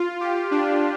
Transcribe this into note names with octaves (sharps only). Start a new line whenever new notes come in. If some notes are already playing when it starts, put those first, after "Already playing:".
Already playing: F4
G4
D4